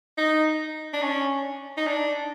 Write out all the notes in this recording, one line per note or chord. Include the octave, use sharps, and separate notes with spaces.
D#4
D4
C#4
D#4
D4